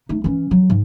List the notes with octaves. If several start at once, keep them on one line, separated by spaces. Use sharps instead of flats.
A3 D#4
E3 C#4
F#3
G#2